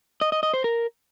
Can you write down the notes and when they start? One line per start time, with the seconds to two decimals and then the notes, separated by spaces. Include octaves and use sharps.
0.21 D#5
0.32 D#5
0.43 D#5
0.54 C5
0.64 A#4